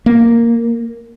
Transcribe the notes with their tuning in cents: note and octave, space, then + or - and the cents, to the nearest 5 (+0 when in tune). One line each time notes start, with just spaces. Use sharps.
A#3 -5